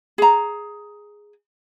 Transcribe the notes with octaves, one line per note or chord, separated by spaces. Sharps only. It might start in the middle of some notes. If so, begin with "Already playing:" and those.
G#4 A#5